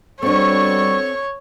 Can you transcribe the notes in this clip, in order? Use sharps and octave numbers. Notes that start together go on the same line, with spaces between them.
B2 G3 C4 D4 A4 C#5 C#6